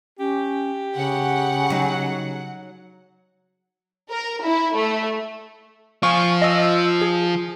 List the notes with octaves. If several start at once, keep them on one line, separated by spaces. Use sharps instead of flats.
C#4 G4
C#3 F#5
F#3 D#4
A#4
E4
A3
F3 F4 G#5 C#6
D#5 E6
E6
G#4